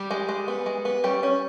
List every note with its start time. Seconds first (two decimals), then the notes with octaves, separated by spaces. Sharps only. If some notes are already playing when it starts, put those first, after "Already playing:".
Already playing: G3 G4
0.11 G#3
0.29 G#3
0.48 B3
0.66 G#3
0.85 B3
1.04 G3 C#4 G4
1.23 C#4